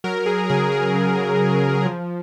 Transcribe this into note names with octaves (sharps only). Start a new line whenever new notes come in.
F#3 A#4
G#4
C#3 G#4
G#4
C#3
F#3
F3